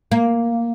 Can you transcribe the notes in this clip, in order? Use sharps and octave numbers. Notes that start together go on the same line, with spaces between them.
A#3